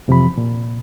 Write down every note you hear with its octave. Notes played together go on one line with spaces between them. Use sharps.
F2 C3 E3 F3 B5
A#2